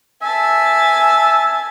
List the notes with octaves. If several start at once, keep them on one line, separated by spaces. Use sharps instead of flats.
E5 G#5 A5